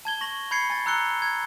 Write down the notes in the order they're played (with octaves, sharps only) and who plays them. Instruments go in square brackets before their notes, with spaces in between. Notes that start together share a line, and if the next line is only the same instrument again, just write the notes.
[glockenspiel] A5 G#6 G7
C#6 A#6 F#7
B5 G6 G#6 C7 C#7
G#5 G#6 A6
A#5 E6 F#6 G6 C#7 G7
G#6